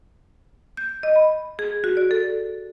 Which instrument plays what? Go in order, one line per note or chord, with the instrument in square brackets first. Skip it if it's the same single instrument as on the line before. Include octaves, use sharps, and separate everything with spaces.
[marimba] G6
D#5
B5
G#4
F#4
D5
A4